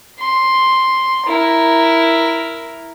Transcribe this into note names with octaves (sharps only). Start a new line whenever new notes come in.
C6
E4 A#4